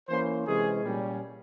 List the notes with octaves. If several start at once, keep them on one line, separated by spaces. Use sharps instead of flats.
E3 A#3 C#4 C5
C3 E3 G#3 C#4 G#4
A#2 G3 C#4